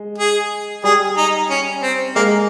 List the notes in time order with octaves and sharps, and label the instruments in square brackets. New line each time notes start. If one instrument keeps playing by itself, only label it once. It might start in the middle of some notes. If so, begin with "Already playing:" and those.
Already playing: [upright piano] G#3
[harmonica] G#4
[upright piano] G3 [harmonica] G#4
[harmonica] D#4
C#4
C4
[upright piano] G#3 [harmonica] A#3